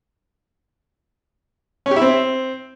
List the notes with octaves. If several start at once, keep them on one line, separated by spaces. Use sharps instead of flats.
C#4
G4
E4
C4